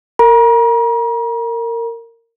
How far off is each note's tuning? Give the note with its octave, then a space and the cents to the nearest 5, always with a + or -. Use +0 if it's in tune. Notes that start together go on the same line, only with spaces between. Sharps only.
A#4 -20 A#5 +40